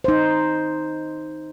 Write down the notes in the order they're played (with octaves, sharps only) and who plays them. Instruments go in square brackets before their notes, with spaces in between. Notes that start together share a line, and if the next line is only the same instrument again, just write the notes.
[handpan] D#4 C5